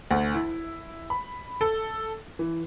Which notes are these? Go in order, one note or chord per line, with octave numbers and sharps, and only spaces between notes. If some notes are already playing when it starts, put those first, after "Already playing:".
D2
E4
B5
A4
E3